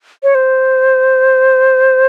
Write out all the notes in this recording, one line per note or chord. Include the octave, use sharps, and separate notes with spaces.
C#5
C5